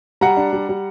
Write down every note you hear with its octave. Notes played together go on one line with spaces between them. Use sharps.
G3 F#5 A#5
D4
G3
G3